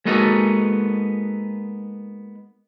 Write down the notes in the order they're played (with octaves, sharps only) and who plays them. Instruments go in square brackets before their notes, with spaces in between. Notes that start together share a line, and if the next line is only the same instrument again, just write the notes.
[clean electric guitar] G#3 A#3 B3 D#4 F#4 A4